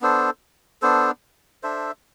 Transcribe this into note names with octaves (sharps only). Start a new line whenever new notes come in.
B3 D4 A4 C5
B3 D4 A4 C5
D4 A4 C5 E5